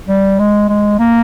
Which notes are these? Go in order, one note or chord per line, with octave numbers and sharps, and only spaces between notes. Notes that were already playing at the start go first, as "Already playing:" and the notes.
G3
G#3
G#3
A#3